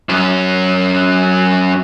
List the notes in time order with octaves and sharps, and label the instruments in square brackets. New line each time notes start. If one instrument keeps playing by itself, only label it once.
[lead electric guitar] F#2 C#4